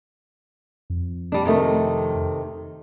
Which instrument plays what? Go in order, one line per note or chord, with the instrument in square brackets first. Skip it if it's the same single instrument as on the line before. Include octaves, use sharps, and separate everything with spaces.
[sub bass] F2
[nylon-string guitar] G3 D4
C3 D#3 A3